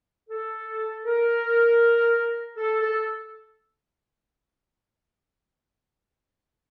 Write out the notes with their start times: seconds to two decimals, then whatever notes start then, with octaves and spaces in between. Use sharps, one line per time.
0.30 A4
1.05 A#4
2.57 A4
2.81 A4